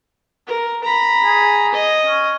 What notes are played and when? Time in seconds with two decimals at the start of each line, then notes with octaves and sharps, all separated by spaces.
0.47 A#4
0.84 A#5 B5
1.24 G#4
1.73 D#5
2.06 C#4